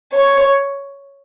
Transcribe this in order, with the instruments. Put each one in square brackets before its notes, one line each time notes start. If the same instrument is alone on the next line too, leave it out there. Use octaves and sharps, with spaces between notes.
[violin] C#5